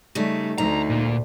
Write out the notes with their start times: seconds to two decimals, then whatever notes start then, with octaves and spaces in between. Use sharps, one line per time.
0.15 C#3 G3 A3 D#4
0.58 D2 D#4 A#5
0.90 A#2